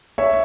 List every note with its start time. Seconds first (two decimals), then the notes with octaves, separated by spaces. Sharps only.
0.18 C#5 E5